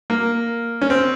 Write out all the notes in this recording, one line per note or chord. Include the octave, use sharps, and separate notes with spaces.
A#3
C#4
C4